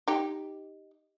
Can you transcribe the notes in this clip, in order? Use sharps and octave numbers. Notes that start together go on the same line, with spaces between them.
D#4 G4